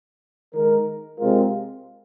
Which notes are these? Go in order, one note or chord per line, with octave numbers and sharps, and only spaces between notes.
D#3 G#3 D#4 A#4
C3 G#3 C4 F4 A#4